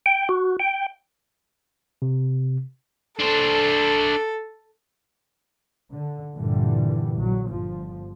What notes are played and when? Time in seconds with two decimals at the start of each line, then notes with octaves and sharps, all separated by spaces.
0.06 G5
0.29 F#4
0.60 G5
2.02 C3
3.19 D4 A4 C5
5.91 D3
6.36 G2 A#2 D3 E3 G3
7.19 A#1 F#3
7.50 G1 F3